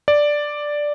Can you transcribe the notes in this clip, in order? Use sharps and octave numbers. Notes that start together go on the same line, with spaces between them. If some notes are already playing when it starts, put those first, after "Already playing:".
D5